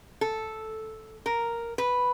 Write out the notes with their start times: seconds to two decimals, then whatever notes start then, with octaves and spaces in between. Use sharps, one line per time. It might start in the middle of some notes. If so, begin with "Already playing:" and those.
0.21 A4
1.26 A#4
1.78 B4